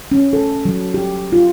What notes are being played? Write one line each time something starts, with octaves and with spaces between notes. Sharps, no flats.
C#4
A4
F#3
G4
F4